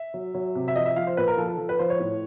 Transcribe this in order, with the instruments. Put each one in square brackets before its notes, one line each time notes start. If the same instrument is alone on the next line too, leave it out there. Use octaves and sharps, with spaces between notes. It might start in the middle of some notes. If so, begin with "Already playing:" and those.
Already playing: [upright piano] E5
F#3
F#3
C3
E5
F3 D#5
E5
F3 F5
C5
A#2 B4
A#4
F3 A4
A4
F3
B4
F3 C5
C#5
A2